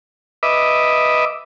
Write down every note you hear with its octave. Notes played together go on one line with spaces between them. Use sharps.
B4 D#5 E5 D6